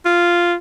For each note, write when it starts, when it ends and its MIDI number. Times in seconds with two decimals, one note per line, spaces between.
0.05 0.55 65